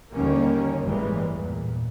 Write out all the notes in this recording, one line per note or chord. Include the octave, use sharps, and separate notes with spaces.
D#2 D3 D#3 G3 A#3 C#4
G1 A2 E3 G3 G#3 A#3
E2 A#2